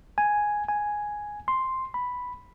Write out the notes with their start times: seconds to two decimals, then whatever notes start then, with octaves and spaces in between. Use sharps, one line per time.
0.18 G#5
0.68 G#5
1.48 C6
1.94 B5